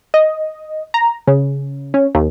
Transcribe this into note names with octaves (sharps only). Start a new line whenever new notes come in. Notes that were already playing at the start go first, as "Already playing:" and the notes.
D#5
A#5
C#3
C#4
D#2